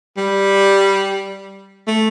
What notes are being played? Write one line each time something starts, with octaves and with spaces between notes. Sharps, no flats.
G3
A3